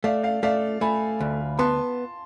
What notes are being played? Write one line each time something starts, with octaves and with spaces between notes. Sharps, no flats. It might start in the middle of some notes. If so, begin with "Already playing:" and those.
A3 D5 F5
D5 F5
A3 D5 F5
A3 G#5 B5
D2
B3 A5 C6